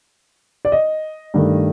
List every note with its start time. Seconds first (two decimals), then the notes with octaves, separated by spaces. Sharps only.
0.65 D5
0.72 D#5
1.34 G2 D#3 A3